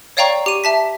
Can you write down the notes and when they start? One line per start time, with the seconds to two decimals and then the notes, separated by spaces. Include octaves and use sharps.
0.17 C#5 D5 F5 G5 A#5 C#6
0.46 G4 D#7
0.64 E5 A5 B6